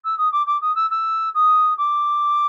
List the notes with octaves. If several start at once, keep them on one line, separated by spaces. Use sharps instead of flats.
E6
D#6
D6
D6
D#6
E6
E6
D#6
D6